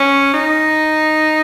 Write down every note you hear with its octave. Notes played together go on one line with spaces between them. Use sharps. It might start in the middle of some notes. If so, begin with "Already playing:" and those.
Already playing: C#4
D#4